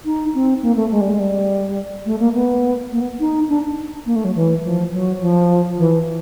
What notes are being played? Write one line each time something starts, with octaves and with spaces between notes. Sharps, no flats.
D#4
C4
A#3
A3
G#3
G3
G#3
G3
A3
A#3
B3
A#3
B3
D#4
D4
A#3
A3
F#3
E3
F3
F#3
F3
E3